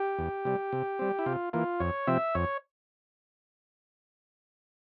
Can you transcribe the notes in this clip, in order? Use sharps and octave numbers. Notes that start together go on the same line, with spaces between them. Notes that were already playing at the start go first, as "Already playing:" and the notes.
Already playing: G4
E2
C3 G3
C3
G3 C4
E4
C3 F4
E3 A#3 F4
F2 C#5
C3 F3 C4 E5
F2 C#5